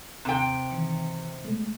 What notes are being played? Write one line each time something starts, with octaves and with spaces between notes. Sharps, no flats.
D#2 C3 G5
D#3 E3 C#7
B2 G#3 A3